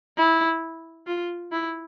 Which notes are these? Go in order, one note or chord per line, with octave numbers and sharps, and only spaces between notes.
E4
F4
E4